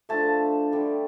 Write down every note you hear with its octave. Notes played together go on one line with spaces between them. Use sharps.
D3 F3 A3 A5
D3 G3